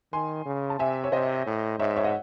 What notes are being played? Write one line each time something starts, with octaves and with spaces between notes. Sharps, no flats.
D#3 G#5 C6
C#3
A5
C3 E5 G#5
C#5
C3 C5 D#5
A2
G#2 C#5 E5
C#5 E5
D#5 F#5